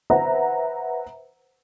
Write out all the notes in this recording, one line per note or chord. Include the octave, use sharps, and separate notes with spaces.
B4 C5 E5 F#5 A#5